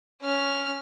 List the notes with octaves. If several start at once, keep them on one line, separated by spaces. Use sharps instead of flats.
C#4 F6